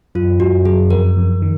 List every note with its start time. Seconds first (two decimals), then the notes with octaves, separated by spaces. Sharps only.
0.15 F#2 F4
0.40 F#2 F#4
0.65 F#2 G#4
0.91 F2 A#4
1.17 F2
1.42 D#3